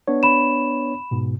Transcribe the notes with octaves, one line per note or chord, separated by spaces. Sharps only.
B3 D4 C#5
B5 E7
G#2 B2